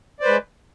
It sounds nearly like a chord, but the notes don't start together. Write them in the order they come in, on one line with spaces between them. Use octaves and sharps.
D5 C5 B4 G#3